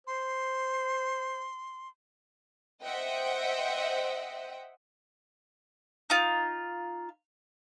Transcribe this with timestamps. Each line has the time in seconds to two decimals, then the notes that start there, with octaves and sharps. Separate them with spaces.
0.07 C5 C6
2.83 C5 D#5 E5 F#5 G5
6.10 D#4 F4